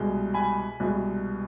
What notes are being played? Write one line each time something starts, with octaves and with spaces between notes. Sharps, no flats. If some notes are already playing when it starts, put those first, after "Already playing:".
Already playing: C2 B2 G#3
G#5 B5
C2 B2 G#3